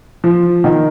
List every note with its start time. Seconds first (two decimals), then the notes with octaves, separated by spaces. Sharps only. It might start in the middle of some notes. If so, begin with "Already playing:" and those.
0.24 F3
0.64 D#3